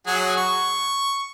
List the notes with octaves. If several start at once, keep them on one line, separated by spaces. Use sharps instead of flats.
F#3 F#4 G#4
C#6